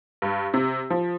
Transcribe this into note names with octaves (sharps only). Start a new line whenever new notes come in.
G2
C3
F3